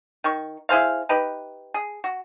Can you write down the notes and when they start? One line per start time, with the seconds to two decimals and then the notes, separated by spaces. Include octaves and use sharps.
0.24 D#3 C#6
0.69 E4 G#4 C5 F5
1.09 D#4 G4 B4
1.74 G#4
2.04 F#4